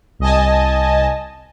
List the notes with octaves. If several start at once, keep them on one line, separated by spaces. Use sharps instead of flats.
C2 D#5 G#5 A5